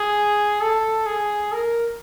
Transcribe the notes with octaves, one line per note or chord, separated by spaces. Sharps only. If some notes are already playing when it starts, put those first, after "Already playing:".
Already playing: G#4
A4
G#4
A#4